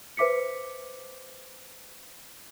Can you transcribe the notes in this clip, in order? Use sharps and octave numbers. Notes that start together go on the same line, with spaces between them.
B4 C5 E5 D6 B6 C#7